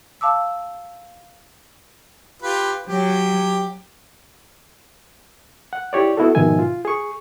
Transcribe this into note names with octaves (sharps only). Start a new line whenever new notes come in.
F5 A5 D6 E6
F4 G4 B4
F#3 G4
F#5
E4 G4 C#5 D5
B3 E4 F#4 A4
G#2 B2 D#3 F3 E5 G#5
F4
G#4 C#6